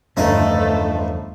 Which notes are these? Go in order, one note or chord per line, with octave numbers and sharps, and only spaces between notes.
G1 E2 C#3 F3 A3 D#4 D#5